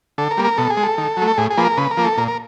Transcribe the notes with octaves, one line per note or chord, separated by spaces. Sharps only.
D3 A4
A#4
G3 A#3
A#4
B2 A4
G#4
G#3
A4
D#3
F#3
A3
A4
A2 G#4
G#4
F3 A#3 B4
A#4
C#3 B4
A#4
F3 A#3
A4
A#2 A#4
A#4